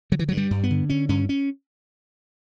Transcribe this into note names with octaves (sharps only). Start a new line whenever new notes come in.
D3 F#3
E3
G2 F#3
G3
G2
B3
D3
D3 C#4
G2 C#4
C#4